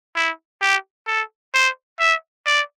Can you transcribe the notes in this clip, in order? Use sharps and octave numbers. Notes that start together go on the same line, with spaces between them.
E4
G4
A4
C5
E5
D5